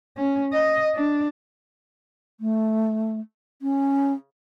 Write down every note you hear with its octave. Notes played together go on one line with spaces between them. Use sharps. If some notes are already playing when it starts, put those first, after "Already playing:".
C#4
D#5
D4
A3
C#4